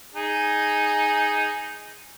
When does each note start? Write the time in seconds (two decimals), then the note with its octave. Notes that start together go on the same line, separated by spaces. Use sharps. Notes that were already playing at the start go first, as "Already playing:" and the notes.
0.14 D#4 G#4